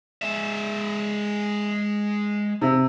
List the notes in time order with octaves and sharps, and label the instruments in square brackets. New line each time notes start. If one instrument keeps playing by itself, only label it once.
[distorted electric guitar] G#3 E5
[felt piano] C3